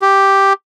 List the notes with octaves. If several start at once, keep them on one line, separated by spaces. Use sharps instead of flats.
G4